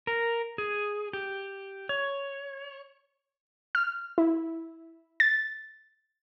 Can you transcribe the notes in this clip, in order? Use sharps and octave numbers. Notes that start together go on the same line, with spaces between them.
A#4
G#4
G4
C#5
F6
E4
A6